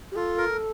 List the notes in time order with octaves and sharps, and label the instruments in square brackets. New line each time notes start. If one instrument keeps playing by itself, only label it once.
[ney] G4
[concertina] F4 [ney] A4
[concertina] A#4